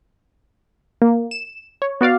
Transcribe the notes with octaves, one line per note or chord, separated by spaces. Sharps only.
A#3
E7
C#5
B3 F#4 D5 F5